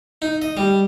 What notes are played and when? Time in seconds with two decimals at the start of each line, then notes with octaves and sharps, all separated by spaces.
0.22 D#4
0.42 D#5
0.57 G3